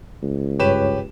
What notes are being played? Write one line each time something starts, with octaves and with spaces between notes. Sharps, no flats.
C#2
G2 G4 B4 C#5 E7